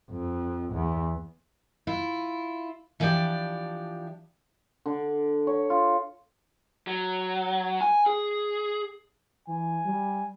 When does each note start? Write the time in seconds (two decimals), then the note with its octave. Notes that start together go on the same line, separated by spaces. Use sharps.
0.11 F2
0.73 E2
1.87 E4 F4
3.00 E3 F3 D4 G4 D5
4.86 D3
5.47 C#5
5.70 F4
6.87 F#3
7.81 G#5
8.06 G#4
9.48 E3 G#5
9.85 G3